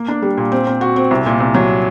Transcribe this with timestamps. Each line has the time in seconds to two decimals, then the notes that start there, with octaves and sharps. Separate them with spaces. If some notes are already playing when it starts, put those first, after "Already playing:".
Already playing: A#3
0.08 D4
0.22 G3
0.37 A#2
0.52 C4
0.67 C4
0.81 F#4
0.96 C4
1.11 C2
1.26 A#2
1.40 C2
1.55 F#3